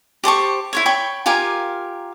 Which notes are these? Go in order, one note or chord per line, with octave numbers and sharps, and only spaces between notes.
G4 C5 A5 C#6
E4 C5 C#5
C#5 G5 B5 C#6
F4 G4 A#4 G#5